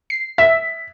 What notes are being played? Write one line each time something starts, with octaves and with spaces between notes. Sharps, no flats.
C7
E5 B6